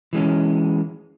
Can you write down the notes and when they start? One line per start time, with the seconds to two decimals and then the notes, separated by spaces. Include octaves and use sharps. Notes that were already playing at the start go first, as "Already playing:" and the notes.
0.13 E3 G#3 C#4